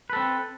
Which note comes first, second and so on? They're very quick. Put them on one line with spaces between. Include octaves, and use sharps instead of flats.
B4 A4 C4